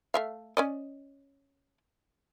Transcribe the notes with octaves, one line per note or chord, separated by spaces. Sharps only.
A3 E5 F5
C#4 D5 D#5